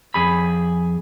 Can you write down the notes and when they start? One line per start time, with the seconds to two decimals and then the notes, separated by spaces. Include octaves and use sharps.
0.14 F2 G#4 B5